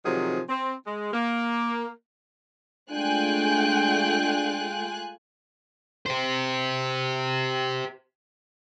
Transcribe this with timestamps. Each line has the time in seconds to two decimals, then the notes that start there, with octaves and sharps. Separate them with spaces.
0.05 C3 D#3 F3 F#3 G#4
0.49 C4
0.86 G#3
1.13 A#3
2.90 G#3 A3 D4 F4 G5 G#5 F#6
6.06 G4 C5